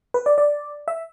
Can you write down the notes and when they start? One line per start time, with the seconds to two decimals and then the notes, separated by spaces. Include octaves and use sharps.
0.14 B4
0.26 D5
0.38 D5
0.88 E5